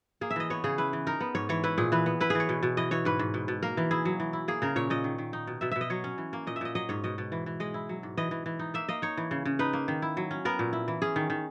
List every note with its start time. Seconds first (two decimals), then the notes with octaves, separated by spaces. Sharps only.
0.21 A#3 G#4
0.31 E5
0.36 E3 D#5
0.50 B3 C#5
0.64 C#3 G#4
0.78 E4 B4
0.93 E3
1.07 D#4 A#4
1.20 B3
1.35 G#2 C#5
1.49 E3 C#5
1.64 E4 B4
1.78 A#2 G#4
1.92 E3 B4
2.06 B3
2.20 E4 B4
2.30 G#4
2.35 E3 C#5
2.49 B2
2.63 B2
2.77 E3 D#5
2.91 E3 C#5
3.05 G#2 B4
3.19 G#2
3.34 B2
3.48 B2
3.63 A#3 A#4
3.77 E3
3.91 E4 G#4
4.05 F#3
4.20 E3
4.33 E4
4.48 A#3 G#4
4.62 C#3 A#4
4.76 A#2 C#5
4.90 A#2 D#5
5.04 D#3
5.18 D#3
5.33 D#4
5.47 B2
5.61 B2 E5
5.71 B2 E5
5.81 D#5
5.90 F#3 C#5
6.04 C#4
6.18 E3
6.33 A#3
6.47 A#2 D#5
6.56 E5
6.61 A#2 D#5
6.75 F#3 D#5
6.89 G#2 C#5
7.04 B2 D#5
7.18 B2
7.32 E3
7.46 E3
7.60 G#3 D#5
7.74 E4
7.89 F#3
8.03 G#2
8.17 E3 D#5
8.31 E3
8.46 E3
8.59 D#4
8.74 A#3 E5
8.89 A#3 D#5
9.02 D#4 C#5
9.17 E3
9.31 C#3
9.45 C#3
9.59 D#4 B4
9.73 A#3
9.88 D#3
10.02 E4
10.17 F#3
10.31 C#4
10.45 B3 A#4
10.59 A#2
10.73 E4
10.88 E3
11.02 C#4 G#4
11.16 D#3
11.30 D#3